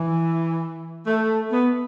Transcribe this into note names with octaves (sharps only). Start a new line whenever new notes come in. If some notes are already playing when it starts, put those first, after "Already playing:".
Already playing: E3
A3
B3